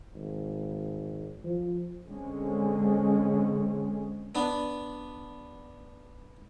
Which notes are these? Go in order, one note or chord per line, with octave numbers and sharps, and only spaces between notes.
G#1
F3
D3 G#3 C4 C#4
B3 D4